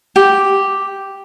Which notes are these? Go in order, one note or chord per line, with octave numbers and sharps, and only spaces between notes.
G4